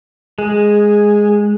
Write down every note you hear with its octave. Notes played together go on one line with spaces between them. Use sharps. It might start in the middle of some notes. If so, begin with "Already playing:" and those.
G#3 G#4